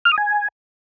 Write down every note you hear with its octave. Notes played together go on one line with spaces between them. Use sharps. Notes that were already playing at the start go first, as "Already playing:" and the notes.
F6
D#6
G#5